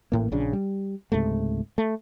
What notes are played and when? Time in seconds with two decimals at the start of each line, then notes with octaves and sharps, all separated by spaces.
0.12 A1 A2 A#3
0.32 A#1 C#3 D4
0.53 G3
1.12 C#2 G#2 C3 A3
1.78 A3